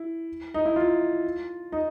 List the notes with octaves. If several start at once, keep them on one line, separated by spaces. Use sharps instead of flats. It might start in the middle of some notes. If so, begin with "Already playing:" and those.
Already playing: E4
D#4
E4
F4
D#4